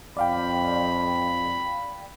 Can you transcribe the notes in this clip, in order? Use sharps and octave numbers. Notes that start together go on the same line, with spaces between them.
F2 D5 F5 G5 B5